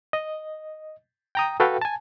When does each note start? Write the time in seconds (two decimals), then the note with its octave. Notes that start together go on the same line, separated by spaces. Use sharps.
0.13 D#5
1.35 G5 A#5 D#6
1.60 F#4 A4 B4 F5 G5
1.81 G#5 A5